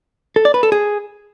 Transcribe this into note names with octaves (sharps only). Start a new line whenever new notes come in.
A4
D5
B4
A4
G#4